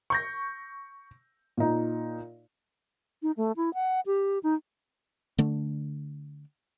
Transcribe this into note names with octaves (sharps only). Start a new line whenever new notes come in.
C#6 G6 A#6
A#2 D#4
D#4
A3
E4
F#5
G4
D#4
D3 A3 D4